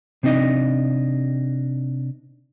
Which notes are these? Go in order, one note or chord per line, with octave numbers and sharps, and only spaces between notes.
C3 C4 D4 D#4 D#5